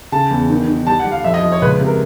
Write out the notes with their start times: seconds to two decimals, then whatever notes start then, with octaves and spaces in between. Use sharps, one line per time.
0.12 C#3 A5
0.31 E2
0.49 D#3
0.68 D#3
0.87 G3 A5
0.99 F#5
1.05 G3
1.12 F5
1.24 F2 E5
1.34 D#5
1.43 F3
1.52 C#5
1.62 C#2 B4
1.79 C3
1.87 A#4